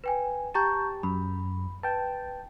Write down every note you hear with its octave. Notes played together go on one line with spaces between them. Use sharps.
B4 G5 G#5
G4 A5 A#5 C#6 G6
F#2 B5
B4 G5 A5